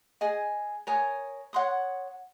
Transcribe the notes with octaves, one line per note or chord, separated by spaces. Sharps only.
G#4 D#5 G#5 D#6
A#4 C#5 G#5 D#6
C#5 F#5 C6 D#6